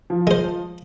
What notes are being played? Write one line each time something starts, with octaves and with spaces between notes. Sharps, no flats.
F3
G#3 C5